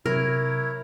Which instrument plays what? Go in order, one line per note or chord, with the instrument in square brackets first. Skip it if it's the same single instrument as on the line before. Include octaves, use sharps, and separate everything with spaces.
[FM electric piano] C3 F#3 [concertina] E4 C#5 [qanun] A#4